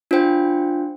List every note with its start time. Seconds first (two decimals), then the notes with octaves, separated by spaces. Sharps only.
0.11 D4 F4 C5 G5